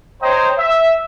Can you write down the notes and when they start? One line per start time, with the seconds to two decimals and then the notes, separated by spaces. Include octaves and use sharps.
0.21 C5 C#5 D#5 G5 A#5
0.58 E5